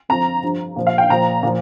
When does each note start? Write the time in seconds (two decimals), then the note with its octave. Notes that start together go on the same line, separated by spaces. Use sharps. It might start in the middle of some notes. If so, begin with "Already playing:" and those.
0.09 F2 F3 A#5
0.43 G2 F3
0.76 A#2 F3
0.87 F5
0.98 G5
1.10 A#2 F3 A#5
1.43 A#2 F3